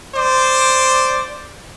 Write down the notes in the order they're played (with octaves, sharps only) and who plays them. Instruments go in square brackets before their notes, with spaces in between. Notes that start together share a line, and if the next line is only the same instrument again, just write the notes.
[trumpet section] C5 D5 D6